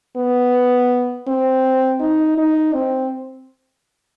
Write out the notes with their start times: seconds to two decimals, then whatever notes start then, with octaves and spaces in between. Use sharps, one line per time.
0.17 B3
1.27 C4
2.00 D#4
2.37 D#4
2.74 C4